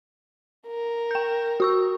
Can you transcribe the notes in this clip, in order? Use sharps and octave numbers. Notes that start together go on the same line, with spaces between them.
A#4
G5 G6
F#4 C#6 E6